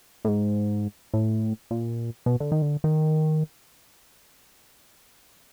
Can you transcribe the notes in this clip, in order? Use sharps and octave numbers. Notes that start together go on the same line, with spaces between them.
A2
G#2
A2
A#2
B2
D3
D#3
D3
D#3